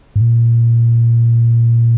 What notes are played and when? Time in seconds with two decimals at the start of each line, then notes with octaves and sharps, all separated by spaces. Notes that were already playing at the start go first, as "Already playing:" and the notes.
0.16 G#2
0.21 A#2